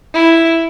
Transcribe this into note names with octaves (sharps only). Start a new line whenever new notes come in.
E4